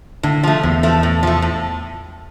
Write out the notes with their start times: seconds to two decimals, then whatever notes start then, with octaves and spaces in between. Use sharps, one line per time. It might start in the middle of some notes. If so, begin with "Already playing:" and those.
0.23 A2 D3
0.43 F3 A3
0.63 E2 A2
0.83 F3 A3
1.03 A2
1.23 F3 A3
1.42 A2